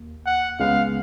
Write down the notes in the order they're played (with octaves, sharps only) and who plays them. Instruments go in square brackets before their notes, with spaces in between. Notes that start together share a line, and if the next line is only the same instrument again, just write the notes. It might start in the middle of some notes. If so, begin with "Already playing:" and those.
Already playing: [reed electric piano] D#2 A#3
[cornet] F#5
[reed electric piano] C#2 C#3 G#3 B3 [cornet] F5